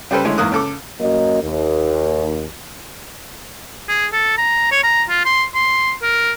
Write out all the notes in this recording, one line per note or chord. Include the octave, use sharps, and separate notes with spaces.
C#3 G3 G4 A4 B4 C5
D3 E3 G#3 A3 C#4
E2 G#2 A#3 D#6 F#6
C#3 A4 D6
F#2 F#3 A#3 D#5
D#2
G#4
A4
A#5
C#5
A#5
F4
C6
C6
A#4